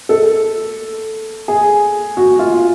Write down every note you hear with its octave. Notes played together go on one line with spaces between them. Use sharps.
A4
G#4
F#4
F4